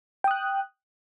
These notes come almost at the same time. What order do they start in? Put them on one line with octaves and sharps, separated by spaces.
G5 D#6 F#6